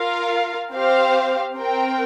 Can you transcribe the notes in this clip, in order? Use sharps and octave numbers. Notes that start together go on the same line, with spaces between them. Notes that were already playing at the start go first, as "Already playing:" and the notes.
Already playing: F4 A#4 F5
C4 G4 C5 F5
C4 A#4 G5